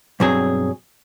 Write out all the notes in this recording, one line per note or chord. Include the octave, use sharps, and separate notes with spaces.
B1 G2 F#3 C4 G#4